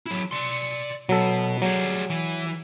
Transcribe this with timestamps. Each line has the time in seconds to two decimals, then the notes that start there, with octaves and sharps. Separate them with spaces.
0.06 F#3 E4
0.31 D5 C6
1.09 B2 F#3 A4
1.62 F#3 G3 G#4
2.10 E3